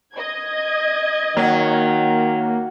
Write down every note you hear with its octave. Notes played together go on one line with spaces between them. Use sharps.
D#5 G#6
D#3 F#3 A#3